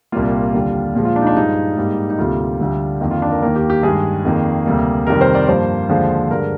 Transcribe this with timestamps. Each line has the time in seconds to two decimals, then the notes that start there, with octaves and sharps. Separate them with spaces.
0.12 C2 A#2 G3 A#3 F4
0.54 D#2 D3 G3
0.95 A#2 F3 G#3
1.05 F4
1.16 D4
1.22 D#4
1.27 D4
1.36 G2 F3 G#3 D#4
1.77 G#2 G3 A#3
2.10 D#4
2.19 D2 C3 G3 A#3 F4
2.61 D2 D3 G3
3.01 F2 D#3 A#3
3.11 F4
3.22 D4
3.32 A#4
3.42 D#2 D#3 A#3 A#4
3.56 G4
3.70 G4
3.83 G2 D#3 G#3 G#4
4.25 F2 D#3 A#3
4.66 D2 C3 G3 A#3
5.07 F2 C3 D#3 G3 A#4
5.21 C5
5.35 D5
5.48 G2 F3 A#3 C5
5.89 D#2 D3 F3 G#3
6.31 G2 D3 G#3 A#4